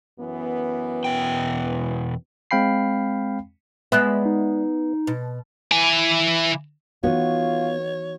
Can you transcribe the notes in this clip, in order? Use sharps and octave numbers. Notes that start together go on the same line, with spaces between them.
F#2 E3 B3
E2 B2 G5
G#3 C4 F5 G5 B5 C7
G#3 B3 D5 E5
D#4
B2
E3 G#5
E3 B3 D#4 F4 F#4 C#5